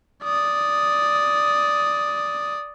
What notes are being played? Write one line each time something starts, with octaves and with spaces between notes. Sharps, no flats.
D5 D#6